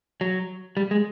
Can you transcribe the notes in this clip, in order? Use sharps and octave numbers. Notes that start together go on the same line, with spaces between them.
F#3
G3
G#3